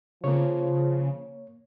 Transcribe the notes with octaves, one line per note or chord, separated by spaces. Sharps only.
C#3 F3 A#3 C#5